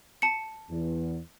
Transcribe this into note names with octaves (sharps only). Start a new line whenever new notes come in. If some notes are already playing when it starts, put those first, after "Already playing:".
A5 C#7
E2